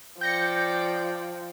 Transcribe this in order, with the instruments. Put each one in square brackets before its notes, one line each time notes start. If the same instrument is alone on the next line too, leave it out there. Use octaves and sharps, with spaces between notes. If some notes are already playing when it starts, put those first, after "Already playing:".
[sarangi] F3 [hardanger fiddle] D5 G5 [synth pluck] G6 A#6 C#7